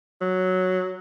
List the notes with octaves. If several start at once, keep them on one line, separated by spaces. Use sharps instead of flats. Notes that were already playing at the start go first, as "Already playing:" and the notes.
F#3